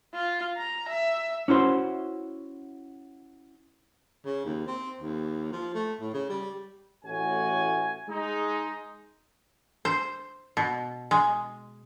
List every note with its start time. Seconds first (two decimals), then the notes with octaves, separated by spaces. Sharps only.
0.14 F4
0.58 A#5
0.89 E5
1.48 C#4 E4 F#4 C5
4.25 C#3
4.45 D#2
4.67 C4
5.00 D#2
5.52 F3
5.74 A3
6.00 A2
6.14 C#3
6.29 G3
7.04 A1 A2 F#4 G#5
8.09 G#3 D#4
9.85 C5
10.57 B2
11.11 G#3